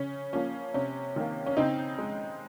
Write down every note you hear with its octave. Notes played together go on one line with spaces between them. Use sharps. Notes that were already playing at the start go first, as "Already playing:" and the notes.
Already playing: C#3 C#4
F3 A#3 C#4
C3 C#4
D#3 A#3
C#4
C#3 C4 D#4
G#3